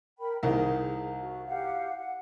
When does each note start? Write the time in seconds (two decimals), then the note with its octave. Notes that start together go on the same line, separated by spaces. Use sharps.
0.18 A#4 G5 B5
0.43 C2 D#3 G#4
1.20 F#4
1.46 G4 F5 F#5
1.97 F#5